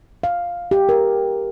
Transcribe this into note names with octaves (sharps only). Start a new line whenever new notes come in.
F5
G4
A#4